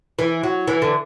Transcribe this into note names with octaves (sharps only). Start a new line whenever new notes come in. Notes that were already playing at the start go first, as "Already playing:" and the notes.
E3
F#3
E3
D3